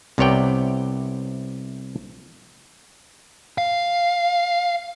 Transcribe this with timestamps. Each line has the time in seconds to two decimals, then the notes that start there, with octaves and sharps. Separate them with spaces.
0.18 C2 C3 B3 C#5 D5 G5
3.58 F5